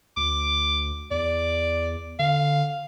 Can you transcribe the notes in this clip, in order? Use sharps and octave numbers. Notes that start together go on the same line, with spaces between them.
D2 D6
E2 D5
D3 F5